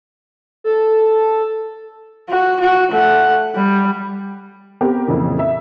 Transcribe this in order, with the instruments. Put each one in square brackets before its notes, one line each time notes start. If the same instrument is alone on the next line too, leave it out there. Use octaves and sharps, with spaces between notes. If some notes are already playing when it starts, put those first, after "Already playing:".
[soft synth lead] A4
[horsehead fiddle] F#4
F#4
A3 F#5
G3
[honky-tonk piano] B3 C4 G4 A#4
F2 A#2 C#3 E3
E5